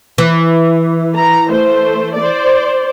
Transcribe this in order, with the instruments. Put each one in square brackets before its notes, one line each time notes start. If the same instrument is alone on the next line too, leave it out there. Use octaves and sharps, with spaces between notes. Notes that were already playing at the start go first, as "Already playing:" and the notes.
[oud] E3
[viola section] A#5
A3 C5
C5 D5